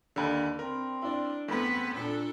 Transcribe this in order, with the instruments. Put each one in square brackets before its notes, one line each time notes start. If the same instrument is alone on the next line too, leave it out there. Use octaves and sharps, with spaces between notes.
[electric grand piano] D#2 D3 [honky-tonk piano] D4 B5
[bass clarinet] C4 [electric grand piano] A#4
[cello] D4 [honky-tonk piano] E4 D5
[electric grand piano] E2 [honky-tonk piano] A3 B5 [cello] B3 B4 [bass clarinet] C4
[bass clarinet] A#2 [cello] D4 A4